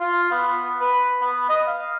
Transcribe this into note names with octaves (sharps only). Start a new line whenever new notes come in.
F4
B3
B4
B3
D#5
F5